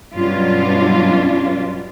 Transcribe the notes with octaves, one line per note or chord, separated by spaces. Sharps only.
G2 B2 F#3 C#4 D4 F4